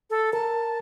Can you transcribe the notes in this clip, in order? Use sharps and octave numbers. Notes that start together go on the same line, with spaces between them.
A4
A#4 A5